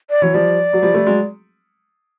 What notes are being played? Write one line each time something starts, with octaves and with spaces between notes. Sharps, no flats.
D5
E3 F#3 C#5
F3 G3 D5
F#3
F3 G3
G3 A3
F#3 G#3